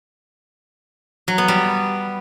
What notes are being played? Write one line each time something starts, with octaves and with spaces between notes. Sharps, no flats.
F#3
B3
G3